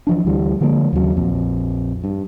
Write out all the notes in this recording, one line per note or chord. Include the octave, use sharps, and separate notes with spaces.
E3 F3 D4
D2 E3 G3
D3 F3 G#3 A#3
D#2 C#3 F#3
A#1 F2
G2